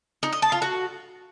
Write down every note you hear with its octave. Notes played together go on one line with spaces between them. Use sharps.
D#4
D#5
A5
F4
F#4